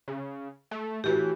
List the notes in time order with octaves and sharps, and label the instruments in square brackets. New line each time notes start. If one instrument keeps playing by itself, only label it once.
[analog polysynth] C#3
A3
[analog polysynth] A2 E3 [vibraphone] F#4 G4